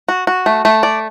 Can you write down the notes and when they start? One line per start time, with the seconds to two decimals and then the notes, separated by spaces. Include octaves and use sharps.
0.08 F#4
0.27 F#4
0.46 A3
0.65 A3
0.83 D5